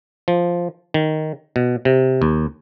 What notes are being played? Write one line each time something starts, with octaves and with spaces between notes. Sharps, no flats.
F3
D#3
B2
C3
D#2